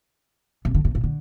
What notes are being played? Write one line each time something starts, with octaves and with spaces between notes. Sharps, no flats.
C3
D3
C3
A#2
D3